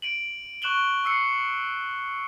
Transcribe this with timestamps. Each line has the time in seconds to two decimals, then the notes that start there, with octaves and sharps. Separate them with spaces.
0.02 D7 D#7 F#7
0.62 C#6 F#6 E7 F#7 G7
1.05 C#6 E6 C7 C#7